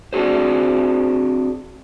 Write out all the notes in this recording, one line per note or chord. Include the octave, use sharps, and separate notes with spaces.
C4 D4 F#4 G#4 C5